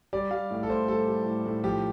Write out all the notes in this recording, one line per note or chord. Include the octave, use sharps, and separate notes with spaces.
G3 D5
G3 F5
A2
A4
A2 C5
G3 A4
G3
A2
A2
F3 G4